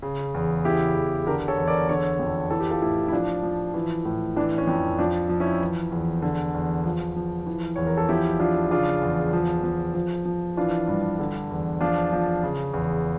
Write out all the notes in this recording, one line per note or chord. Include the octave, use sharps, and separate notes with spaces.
C#3
E2
C#3 E4 G4
E2
D3 G4 A#4
A4 C#5
E2
A#4 D5
D3 A4 C#5
F2
E3 A4
G4
F4 A4
A2 E4 G4
E4
F3 D4 F4
F3
E3
A2
E3 D4
C#4
F2
F3 D4
F3
C#4 E4
E3
E2
D3
E2
F3
F3
E3
E2 C#5
A#4
A4
F3 E4 G4
F3 D4 F4
C#3 D4 F4
E2
F3
F3
F3
F3
E3 D4 F4
G2
D3
E2
F3 D4 F4
F3
C#3
E2